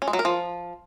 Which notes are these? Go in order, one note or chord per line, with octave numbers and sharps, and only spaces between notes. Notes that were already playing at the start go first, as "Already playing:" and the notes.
C#4
G#3
F#3
A#4
F3